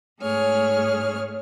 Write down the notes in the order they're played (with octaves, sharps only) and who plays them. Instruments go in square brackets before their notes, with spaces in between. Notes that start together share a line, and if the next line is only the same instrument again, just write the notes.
[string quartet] G#2 A3 G#4 C#5 F6